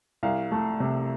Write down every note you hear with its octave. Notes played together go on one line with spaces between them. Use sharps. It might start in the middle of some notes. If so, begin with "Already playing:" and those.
C2 F5
A3
C3